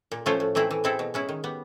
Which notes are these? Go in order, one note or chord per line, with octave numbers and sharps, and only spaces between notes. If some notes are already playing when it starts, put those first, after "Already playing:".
A#2
F3 A3 C#4 F4
A2
E3 A3 C4 E4
E3
G#3 C4 E4 A4
B2
G#3 C#4 E4
D#3
G3 B3